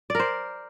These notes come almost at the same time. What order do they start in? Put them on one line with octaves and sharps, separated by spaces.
D5 A#4 C5